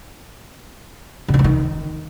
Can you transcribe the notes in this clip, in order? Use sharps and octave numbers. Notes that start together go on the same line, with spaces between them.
C#3
D3
E3
D#3